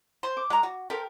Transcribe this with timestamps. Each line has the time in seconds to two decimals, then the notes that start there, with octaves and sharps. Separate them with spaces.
0.23 C5
0.37 D6
0.50 G#3 A#5
0.63 F#4
0.90 G4 A4 A#4 C5